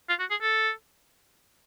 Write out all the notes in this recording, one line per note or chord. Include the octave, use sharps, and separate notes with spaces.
F4
F#4
G#4
A4